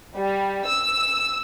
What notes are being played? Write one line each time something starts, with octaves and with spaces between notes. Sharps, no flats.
G3
E6